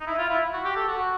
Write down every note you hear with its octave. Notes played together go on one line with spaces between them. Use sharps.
D#4
E4
F4
E4
F#4
G4
A4
F#4